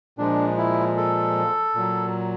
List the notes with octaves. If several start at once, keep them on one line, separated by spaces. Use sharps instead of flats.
A#2 F3 G#3 D4
E4
A4
A#2 F#3